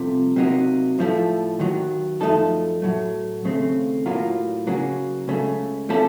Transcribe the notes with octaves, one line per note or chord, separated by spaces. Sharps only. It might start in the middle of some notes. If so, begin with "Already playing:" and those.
Already playing: C2 C3 F3 A3
C3 F#3 A#3 D#4
A2 F3 A3
D#2 D#3 F#3
F#2 F3 A3 D#4 A4
A2 F#3 A3
D#2 C#3 A3 C4
A2 F#3 A#3 F4
C#3 F#3 A#3
C#2 C#3 A3
C3 F3 A3 C#4 A4